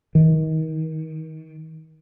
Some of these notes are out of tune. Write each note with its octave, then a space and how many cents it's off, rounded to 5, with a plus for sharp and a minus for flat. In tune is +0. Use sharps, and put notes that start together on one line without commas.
D#3 +30